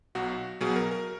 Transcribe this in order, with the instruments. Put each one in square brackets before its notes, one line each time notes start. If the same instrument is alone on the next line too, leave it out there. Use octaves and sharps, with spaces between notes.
[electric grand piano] B1 B2 F#3 F#4
B1 B2 F#3 G#4
A#4
A#4